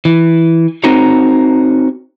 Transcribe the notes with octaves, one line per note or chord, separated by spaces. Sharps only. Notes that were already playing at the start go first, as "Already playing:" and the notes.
E3
C4 D#4 F#4 A#4 C5 C#5